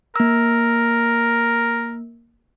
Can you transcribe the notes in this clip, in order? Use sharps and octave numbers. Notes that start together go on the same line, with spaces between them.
A#3 A#4 E6